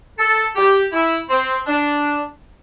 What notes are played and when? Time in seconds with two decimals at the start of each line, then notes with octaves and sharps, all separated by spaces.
0.19 A4
0.56 G4
0.93 E4
1.29 C4
1.67 D4